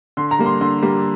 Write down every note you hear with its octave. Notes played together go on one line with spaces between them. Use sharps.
D3 C6
A#5
G3 A#3
C6
D3 C6
G3 A#3